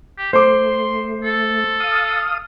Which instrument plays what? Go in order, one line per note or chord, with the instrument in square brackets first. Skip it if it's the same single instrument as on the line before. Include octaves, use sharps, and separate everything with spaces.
[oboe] G4
[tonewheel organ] A3 [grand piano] C5 D6 [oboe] C6
[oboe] A4
[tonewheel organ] F5 D#6